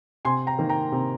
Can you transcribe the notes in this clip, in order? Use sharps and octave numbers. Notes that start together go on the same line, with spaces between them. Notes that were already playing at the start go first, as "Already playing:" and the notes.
C3 G#5 C6
G5 A#5
D#3 A#3
G5 A#5
C3